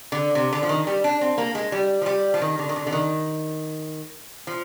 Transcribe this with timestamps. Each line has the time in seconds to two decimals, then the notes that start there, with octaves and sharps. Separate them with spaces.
0.12 D3
0.35 C3
0.53 D3
0.63 F3
0.69 D#3
0.87 G3
1.04 D4
1.21 C4
1.38 A#3
1.55 G#3
1.72 G3
2.02 F3
2.06 G3
2.34 F3
2.42 D#3
2.59 D3
2.69 D#3
2.76 D3
2.87 D3
2.92 D#3
4.47 F3